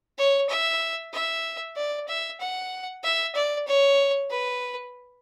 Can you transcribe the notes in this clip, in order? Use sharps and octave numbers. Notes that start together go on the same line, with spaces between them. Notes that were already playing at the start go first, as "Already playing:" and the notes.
C#5
E5
E5
D5
E5
F#5
E5
D5
C#5
B4